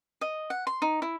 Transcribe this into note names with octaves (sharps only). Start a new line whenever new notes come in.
D#5
F#5
C6
D#4
E4